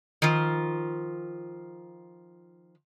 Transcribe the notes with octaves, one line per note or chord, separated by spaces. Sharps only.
D#3 F3 F4